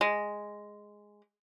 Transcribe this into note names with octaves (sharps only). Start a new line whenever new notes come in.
G#3